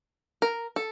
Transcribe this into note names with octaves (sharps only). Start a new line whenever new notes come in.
A#4
A4